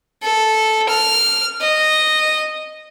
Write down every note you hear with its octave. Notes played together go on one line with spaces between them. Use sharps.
A4
F6
D#5